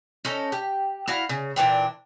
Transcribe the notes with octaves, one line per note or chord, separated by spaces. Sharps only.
C#4 D#4 A4
G4
E4 F#4 F5
C#3
A#2 E3 D4 G5